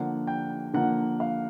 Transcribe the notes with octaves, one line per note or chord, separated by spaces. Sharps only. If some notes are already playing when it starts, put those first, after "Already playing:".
Already playing: D3 F3 A#3 F#5
G5
D3 F3 A#3 F#5
F5